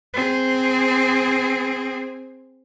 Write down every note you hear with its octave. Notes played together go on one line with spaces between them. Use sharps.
C4 G#4